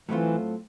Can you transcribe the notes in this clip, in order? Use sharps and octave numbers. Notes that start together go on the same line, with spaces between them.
A2 E3 F#3 A3 C4 F4